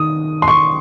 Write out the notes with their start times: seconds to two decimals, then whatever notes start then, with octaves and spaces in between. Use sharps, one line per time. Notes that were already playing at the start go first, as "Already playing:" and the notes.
Already playing: D#3 D#6
0.42 C6
0.48 C#6